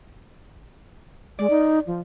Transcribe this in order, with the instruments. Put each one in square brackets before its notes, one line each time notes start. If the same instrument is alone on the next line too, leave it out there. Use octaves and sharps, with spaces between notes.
[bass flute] G#3 [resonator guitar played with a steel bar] D5
[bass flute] D#4
F3